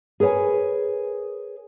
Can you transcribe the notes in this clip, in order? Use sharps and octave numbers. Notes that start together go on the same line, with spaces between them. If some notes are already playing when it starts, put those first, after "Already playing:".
G#4 A#4 B4 C#5 G#5